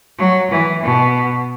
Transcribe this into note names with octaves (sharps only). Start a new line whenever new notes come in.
F#3
E3
B2